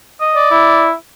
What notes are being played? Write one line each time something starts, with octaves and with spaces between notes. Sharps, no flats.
D#5
D5
E4